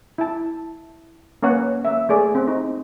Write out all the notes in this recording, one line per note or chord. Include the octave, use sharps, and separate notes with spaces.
E4 A5
A#3 C#4 B4 C#5 F#5
A#3 E5
A3 G#4 D5
C4
D#4